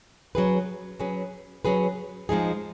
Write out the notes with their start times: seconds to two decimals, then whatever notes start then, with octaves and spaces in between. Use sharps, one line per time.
0.35 F#3 C#4 G#4 B4
0.99 F#3 C#4 G#4 B4
1.65 F#3 C#4 G#4 B4
2.29 F3 G#3 D#4 G#4